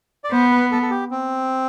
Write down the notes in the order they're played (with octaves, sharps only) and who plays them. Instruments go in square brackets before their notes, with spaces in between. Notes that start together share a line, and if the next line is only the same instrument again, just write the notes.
[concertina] D5
[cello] B3 [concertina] C5
[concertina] B4
A4
A4
G4
C4